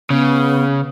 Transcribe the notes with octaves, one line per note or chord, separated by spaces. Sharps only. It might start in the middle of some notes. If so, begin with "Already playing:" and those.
C#3 B3